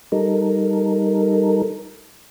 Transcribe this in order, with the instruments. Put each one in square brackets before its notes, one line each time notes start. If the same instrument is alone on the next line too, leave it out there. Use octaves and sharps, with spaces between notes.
[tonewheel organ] G3 D#4 A4 A#4